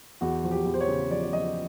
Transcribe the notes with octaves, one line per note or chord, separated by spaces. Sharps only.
E2 F#4
F3
G4
E2
C5
C#5
C#3
F3 D5
D5
F3 D#5